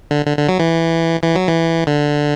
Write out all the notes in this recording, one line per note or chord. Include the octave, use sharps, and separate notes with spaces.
D3
D3
D3
F#3
E3
E3
F#3
E3
D3